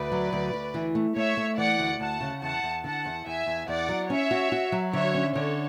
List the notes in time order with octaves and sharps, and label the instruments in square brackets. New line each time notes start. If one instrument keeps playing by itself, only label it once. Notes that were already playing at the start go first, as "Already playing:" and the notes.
Already playing: [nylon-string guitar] D2 [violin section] B4 D5
[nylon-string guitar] F#3
D2
D2
E3
A3
[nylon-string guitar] A3 [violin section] C#5 E5
[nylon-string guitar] A3
[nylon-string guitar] E3 [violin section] D5 F#5
[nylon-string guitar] D2
[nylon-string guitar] D2 [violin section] F#5 A5
[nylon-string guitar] C#3
[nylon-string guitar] E2 [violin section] F#5 A5
[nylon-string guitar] E2
[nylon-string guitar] D3 [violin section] F#5 A5
[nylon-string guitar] E2
[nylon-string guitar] E2 [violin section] E5 G#5
[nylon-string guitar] E2
[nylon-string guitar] E2 [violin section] D5 F#5
[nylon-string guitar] F#3
[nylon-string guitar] C#4 [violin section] C#5 E5
[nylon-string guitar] F#4
F#4
F#3
[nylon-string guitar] D3 [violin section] C#5 E5
[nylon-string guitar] C#4
[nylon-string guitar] D3 [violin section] A4 C#5